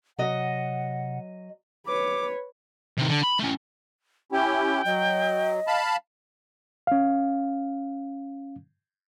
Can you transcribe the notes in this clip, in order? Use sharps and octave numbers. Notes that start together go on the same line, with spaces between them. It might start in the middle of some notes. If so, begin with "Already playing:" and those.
C3 F#3 D#5 F#5
B4 C#5 D6
C3 D#3
D3
B5
A3 C#4
C#4 E4 G4 G5
F#3 D#5
F5 A5 B5
C#4 F5